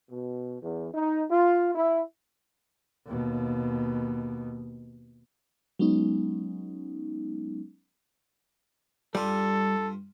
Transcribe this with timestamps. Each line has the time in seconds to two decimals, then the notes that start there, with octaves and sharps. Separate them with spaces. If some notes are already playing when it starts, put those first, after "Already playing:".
0.10 B2
0.61 E2
0.94 D#4
1.31 F4
1.75 E4
3.06 D#2 B2
5.79 F#3 G#3 B3 C#4 D#4
9.15 G2 G3 F4 A4